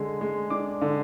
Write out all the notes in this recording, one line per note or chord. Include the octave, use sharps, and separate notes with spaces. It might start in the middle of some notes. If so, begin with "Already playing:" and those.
Already playing: D3 G#3
G#3
D4 D6
D3